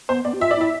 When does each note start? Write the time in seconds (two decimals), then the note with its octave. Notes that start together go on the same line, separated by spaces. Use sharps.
0.09 B3 C5
0.25 B3 D5
0.34 G4
0.40 F4 E5
0.51 D5
0.57 E4 E5